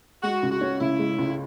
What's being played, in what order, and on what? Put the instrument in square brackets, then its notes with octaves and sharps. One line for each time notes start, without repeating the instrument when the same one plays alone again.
[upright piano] G#3 [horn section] F#4
[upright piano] C#2
[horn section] F#4
[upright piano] C#4
[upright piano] C#3 [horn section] E4
[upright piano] G#3
C#2